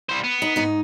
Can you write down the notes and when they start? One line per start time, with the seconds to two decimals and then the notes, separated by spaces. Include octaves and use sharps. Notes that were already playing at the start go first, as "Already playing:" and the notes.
0.09 G3 C5
0.24 B3
0.42 D#4
0.56 G#2 D#4